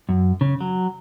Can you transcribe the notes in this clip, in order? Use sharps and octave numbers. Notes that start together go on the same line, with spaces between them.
F#2
C#3
F#3